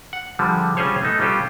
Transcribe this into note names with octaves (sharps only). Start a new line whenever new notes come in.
F#5
D3 F3 G3 G#3
G3 C#4 F4 G#4 C5 C#5
A3 B3 D#4 A4
G3 B3 C#4 F4 G4 A4